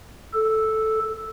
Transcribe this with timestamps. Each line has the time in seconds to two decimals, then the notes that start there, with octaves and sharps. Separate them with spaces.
0.33 A4